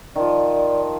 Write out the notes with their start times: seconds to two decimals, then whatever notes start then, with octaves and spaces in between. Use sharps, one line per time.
0.16 D#3 F3 D5